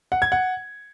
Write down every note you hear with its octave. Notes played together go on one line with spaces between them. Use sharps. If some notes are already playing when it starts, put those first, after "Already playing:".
F#5
G#6
F#5